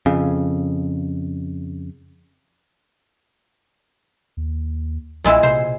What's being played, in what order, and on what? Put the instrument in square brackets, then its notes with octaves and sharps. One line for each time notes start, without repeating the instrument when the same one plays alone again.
[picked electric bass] F2 C#3
[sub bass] D#2
[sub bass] B1 [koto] A#2 G#3 E4
[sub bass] C3 [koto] C5